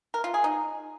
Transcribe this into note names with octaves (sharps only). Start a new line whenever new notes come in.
A#4
F4
G#4
D#4